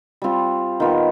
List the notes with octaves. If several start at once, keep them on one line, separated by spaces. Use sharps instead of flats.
G3 C4 F4
D#3 B3 F4